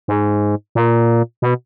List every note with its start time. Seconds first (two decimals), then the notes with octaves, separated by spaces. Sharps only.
0.08 G#2
0.75 A#2
1.42 B2